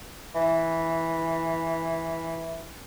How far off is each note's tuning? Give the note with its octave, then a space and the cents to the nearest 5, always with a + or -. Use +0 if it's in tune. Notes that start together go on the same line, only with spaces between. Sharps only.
E3 -5